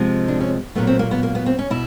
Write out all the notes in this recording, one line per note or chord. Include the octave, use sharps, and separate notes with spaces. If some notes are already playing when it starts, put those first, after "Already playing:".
Already playing: C3 F3 G#3
D4
C#4
A#2 F#3 A3 B3
C4
A#3
B3
A#3
B3
C4
C#4
B2 E4